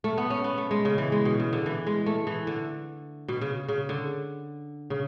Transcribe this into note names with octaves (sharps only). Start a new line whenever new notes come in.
A3
B3
C#4
B3
A3
G#3
C#3
E3
G#3
B2
C#3
D3
E3
G#3
A3
E3
D3
B2
C#3
C#3
D3
C#3